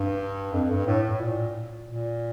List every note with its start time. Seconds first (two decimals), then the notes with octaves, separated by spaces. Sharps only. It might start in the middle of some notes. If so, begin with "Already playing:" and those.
Already playing: G2
0.53 F2
0.70 G2
0.87 A2
1.03 A2
1.21 A#2
1.88 A#2